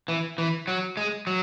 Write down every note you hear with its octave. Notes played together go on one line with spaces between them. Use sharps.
E3
E3
F#3
G#3
F#3